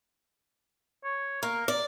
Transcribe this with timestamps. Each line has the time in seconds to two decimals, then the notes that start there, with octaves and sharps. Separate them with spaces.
1.05 C#5
1.43 A#3 A#4
1.68 D5